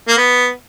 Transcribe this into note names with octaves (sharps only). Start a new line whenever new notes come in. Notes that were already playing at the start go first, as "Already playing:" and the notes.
A#3
B3